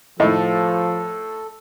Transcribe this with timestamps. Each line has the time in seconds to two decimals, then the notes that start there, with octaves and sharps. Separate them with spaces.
0.20 A2 D#3 F3 A3 D#4 E4 A4